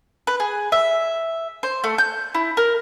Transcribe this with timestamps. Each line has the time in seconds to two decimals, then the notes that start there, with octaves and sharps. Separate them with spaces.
0.27 B4
0.40 G#4
0.72 E5
1.63 C5
1.84 A3
1.98 G6
2.35 E4
2.57 A#4